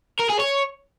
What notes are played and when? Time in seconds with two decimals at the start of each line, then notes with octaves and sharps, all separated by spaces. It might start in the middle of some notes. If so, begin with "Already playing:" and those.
0.20 A#4
0.30 G#4
0.40 C#5